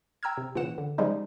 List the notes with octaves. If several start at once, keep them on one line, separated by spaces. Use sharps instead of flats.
G5 A#5 E6 F6 G#6
C3
A#2 C#3 E3 F#5 E7
D3
C#3 F3 G3 G#3 D#4